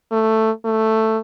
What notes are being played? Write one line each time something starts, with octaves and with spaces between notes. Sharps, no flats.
A3
A3